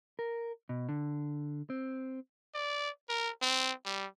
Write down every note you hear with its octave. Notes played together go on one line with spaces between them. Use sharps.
A#4
B2
D3
C4
D5
A#4
C4
G3